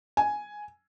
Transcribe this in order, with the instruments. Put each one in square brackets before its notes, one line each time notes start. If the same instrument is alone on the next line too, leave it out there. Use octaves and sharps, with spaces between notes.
[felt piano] G#5